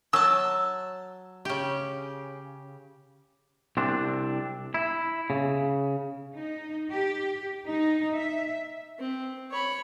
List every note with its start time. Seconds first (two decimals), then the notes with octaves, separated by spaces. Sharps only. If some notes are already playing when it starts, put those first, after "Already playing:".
0.13 F#3 A5 E6
1.45 C#3 G4
3.77 C2 C4 D4
4.74 E4
5.30 C#3
6.33 D#4
6.91 G4
7.68 D#4
8.17 E5
8.99 C4
9.51 C#5 B5